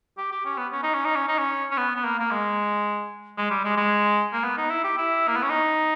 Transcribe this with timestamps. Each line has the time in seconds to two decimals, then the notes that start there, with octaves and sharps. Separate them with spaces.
0.18 G4
0.32 G4
0.45 C#4
0.58 B3
0.72 C#4
0.83 D#4
0.94 C#4
1.05 D#4
1.16 C#4
1.28 D#4
1.38 C#4
1.71 C#4
1.78 B3
1.96 B3
2.05 A#3
2.19 A#3
2.31 G#3
3.37 G#3
3.50 G3
3.65 G#3
3.77 G#3
4.33 A#3
4.44 B3
4.57 D#4
4.70 E4
4.84 G4
4.98 E4
5.28 A#3
5.36 B3
5.43 C#4
5.50 D#4